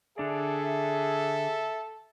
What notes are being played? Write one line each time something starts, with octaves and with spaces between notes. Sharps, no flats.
D3 D4 G#4 A4 D5 E5